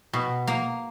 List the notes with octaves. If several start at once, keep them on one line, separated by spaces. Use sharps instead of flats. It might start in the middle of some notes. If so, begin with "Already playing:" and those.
B2
A#3